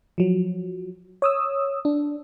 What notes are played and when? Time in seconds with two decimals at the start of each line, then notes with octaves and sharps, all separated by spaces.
0.18 F3 F#3
1.22 C#5 D#6 E6
1.85 D4